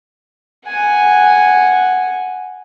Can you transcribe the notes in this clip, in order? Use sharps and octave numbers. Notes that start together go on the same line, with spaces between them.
F#5 G#5